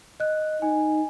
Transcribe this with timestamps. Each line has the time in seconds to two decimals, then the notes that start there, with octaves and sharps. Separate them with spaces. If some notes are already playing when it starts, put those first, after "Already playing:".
0.20 D#5 F#6
0.62 D#4 G#5